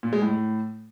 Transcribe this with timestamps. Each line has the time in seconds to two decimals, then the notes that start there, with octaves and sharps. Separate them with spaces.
0.03 A#2
0.13 G#3
0.22 A2